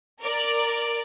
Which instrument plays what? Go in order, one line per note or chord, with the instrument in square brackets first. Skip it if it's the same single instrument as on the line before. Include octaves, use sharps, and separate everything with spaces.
[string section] A#4 D5